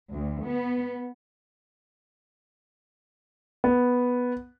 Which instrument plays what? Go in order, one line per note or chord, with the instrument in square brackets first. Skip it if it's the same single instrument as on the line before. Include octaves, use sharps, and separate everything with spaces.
[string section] D2
B3
[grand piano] B3